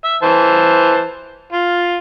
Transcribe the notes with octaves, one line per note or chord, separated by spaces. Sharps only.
E5
E3 C5 A5
F4